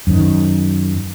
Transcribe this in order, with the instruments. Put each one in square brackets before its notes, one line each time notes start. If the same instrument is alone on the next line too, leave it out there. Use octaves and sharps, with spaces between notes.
[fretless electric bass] F#2 D#3